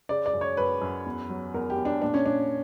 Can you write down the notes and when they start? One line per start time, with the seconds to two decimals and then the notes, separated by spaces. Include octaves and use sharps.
0.09 C#3 D5
0.26 D5
0.33 F#2
0.41 C#5
0.57 F#2 B4
0.81 F#2
1.06 E2
1.29 F#3
1.54 E2 A#4
1.70 G4
1.78 E2
1.85 D4
2.02 A#2 D4
2.14 C#4
2.26 A#2 D4